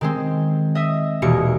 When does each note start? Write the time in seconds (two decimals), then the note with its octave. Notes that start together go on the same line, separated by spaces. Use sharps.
0.01 D#3 G#3 C4
0.75 D#5 E5
1.22 D#1 B2 E3 A#3 C#7